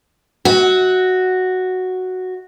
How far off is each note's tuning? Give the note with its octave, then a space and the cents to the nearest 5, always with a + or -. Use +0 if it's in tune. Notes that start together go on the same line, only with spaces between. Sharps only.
F#4 +0 E5 -35